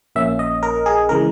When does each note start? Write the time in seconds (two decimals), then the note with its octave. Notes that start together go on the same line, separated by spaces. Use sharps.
0.16 A#1 A#2 A#3 C#4 E5
0.39 D#5
0.63 A#4
0.86 G#4
1.09 C#3 E3 G#3 A#4